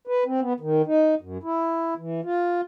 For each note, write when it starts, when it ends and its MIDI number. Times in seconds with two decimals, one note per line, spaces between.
0.07 0.24 71
0.26 0.40 60
0.41 0.53 59
0.60 0.82 51
0.86 1.15 63
1.21 1.38 42
1.43 1.94 64
1.97 2.21 52
2.24 2.61 65